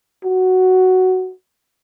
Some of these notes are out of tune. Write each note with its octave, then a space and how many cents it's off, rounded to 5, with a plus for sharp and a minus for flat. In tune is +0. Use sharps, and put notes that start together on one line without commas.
F#4 +5